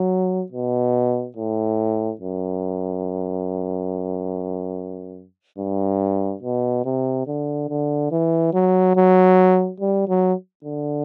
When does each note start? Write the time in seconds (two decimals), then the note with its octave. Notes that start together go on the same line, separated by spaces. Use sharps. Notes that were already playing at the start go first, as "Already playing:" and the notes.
Already playing: F#3
0.52 B2
1.37 A2
2.21 F#2
5.58 G2
6.43 B2
6.85 C3
7.27 D3
7.69 D3
8.12 E3
8.53 F#3
8.96 F#3
9.81 G3
10.08 F#3
10.65 D3